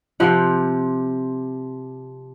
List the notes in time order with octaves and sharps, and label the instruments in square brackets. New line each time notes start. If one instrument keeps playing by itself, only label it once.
[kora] C3 F3 F#5